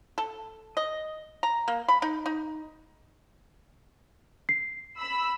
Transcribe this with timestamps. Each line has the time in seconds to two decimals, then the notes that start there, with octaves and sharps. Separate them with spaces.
0.18 A4
0.77 D#5
1.43 A#5
1.68 A#3
1.88 B5
2.02 D#4
2.26 D#4
4.49 C7
4.98 B5 E6